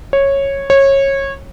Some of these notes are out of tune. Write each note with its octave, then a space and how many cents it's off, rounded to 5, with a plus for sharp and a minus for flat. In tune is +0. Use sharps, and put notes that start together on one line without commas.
C#5 -10
C#5 -20